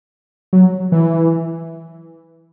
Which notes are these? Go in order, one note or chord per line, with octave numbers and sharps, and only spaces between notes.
F#3
E3